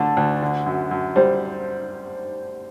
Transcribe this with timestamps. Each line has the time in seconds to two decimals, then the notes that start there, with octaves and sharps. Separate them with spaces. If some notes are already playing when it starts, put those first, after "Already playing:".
Already playing: D3 A3 A5
0.17 D2
0.42 D3
0.66 F#2
0.91 F#2
1.16 G3 C5